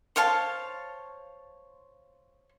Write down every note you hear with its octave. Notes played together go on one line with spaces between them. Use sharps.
C5 C#5 F5 A5